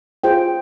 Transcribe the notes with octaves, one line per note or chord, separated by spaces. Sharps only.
F4 G#4 C5 G5